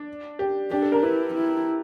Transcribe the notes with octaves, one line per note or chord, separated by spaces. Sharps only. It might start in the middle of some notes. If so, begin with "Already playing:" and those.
Already playing: D4
G4
D4 G4
A4
A#4
E4 B4
E4